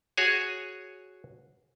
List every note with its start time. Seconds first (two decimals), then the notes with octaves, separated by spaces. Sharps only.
0.17 F#4 G#4 C#5 G#5